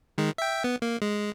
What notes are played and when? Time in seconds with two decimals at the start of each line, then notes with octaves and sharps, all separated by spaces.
0.18 D#3 G#3
0.38 E5 G5
0.64 B3
0.82 A#3
1.02 G#3